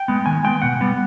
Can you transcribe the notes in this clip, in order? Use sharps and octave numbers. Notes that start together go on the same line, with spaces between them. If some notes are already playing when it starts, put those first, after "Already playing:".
Already playing: G5
G#3 B3
D#3 G#5
G#3 B3 G5
B2 F#5
G3 B3